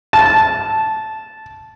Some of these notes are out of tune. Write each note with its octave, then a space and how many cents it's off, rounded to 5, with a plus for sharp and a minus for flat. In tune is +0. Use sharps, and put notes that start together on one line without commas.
A5 -10